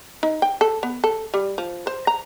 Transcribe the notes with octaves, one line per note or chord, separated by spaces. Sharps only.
D#4
G5
A4
B3
A4
G3
F3
C5
A#5